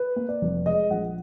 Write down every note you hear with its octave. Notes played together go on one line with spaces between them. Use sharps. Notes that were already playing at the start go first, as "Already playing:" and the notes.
Already playing: B4
A#3
D5
F1
G#3 D#5
A#1 F#5